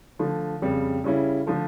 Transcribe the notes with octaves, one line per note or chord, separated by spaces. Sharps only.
D3 F3 A3
F2 C#3 G3
C#3 G3 C#4 E4
D3 F3 A3